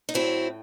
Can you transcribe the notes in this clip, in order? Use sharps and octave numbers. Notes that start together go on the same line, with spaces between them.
D#4
A2 F#3 C4 E4